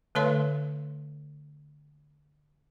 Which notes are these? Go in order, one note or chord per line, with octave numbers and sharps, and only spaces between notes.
D3 A3 B4 C#5 F5 C6